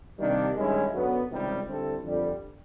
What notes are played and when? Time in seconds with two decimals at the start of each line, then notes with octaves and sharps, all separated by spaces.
0.19 C3 D#3 G3 A#3 D4
0.56 G2 D#3 G#3 C#4 E4
0.92 F#2 D3 F#3 B3
1.29 C#2 C3 D#3 G3
1.65 D3 G3 C4 E4 A4
2.02 F2 D3 G3